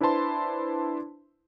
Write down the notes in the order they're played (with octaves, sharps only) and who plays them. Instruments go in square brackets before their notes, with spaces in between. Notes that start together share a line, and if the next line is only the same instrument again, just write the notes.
[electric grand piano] D4 E4 B4 C5 A5 C6